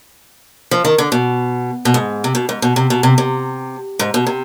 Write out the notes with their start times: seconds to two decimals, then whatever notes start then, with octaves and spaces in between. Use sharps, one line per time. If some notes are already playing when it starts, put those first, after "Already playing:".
0.71 F3
0.85 D#3
0.98 D3
1.12 B2
1.85 B2
1.94 G#2
2.24 C3
2.35 B2
2.49 G#2
2.62 B2
2.76 C3
2.90 B2
3.03 C3
3.18 C3
3.99 G#2
4.14 B2
4.27 C3